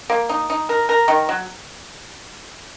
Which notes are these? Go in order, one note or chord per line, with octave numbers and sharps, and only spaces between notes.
A#3
D#4
D#4
A#4
A#4
D#3
F#3